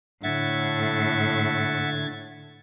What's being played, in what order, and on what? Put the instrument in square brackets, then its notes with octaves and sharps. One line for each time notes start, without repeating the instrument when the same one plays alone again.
[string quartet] A2 [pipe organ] D3 G#6 A6 [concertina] E5 F#5